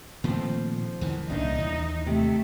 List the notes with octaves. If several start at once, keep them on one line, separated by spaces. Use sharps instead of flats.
A#2 D#3 F3 A3 C4
D2 D#3 E3
C2 A#2 C#3 A3 D4 D#4
D#2 E3
C3 A3